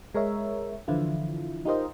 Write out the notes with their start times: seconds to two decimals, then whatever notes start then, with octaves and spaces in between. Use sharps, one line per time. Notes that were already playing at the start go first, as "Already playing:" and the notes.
0.14 G#3 A#4 C#5 E5
0.88 D3 E3 F3 E4 F4
1.65 D#4 F4 G4 A#4 C5 D#5